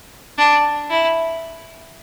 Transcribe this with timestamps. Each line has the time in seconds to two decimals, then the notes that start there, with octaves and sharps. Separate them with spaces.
0.38 D4
0.90 E4